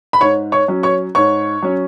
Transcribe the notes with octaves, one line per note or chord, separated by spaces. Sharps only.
B5
G#2 C#5 C#6
C#5 C#6
F#3 C#4
C#5 C#6
G#2 C#5 C#6
F#3 C#4